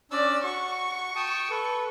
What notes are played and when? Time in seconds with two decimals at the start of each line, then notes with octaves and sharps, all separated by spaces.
0.11 C#4 D4 D5 E6
0.43 F#4 C#6
1.16 G5 A5 D#6
1.50 A4 B4